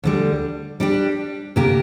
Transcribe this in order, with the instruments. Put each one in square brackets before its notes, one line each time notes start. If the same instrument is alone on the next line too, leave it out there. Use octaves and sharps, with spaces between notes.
[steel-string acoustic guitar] D2 D3 G3
G3 D4 G4
D2 C3 A#3 G4 A#4